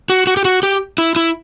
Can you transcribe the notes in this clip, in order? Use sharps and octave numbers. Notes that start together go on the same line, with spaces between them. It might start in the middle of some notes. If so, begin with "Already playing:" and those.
F#4
F#4
G4
F#4
G4
E4
E4